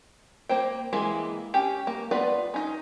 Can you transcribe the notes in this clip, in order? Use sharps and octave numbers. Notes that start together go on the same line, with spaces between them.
A#3 C5 G5
E3 G#3 A#3 E4
C#4 G4
A#3
B3 F4 B4 D5
C#4 D#4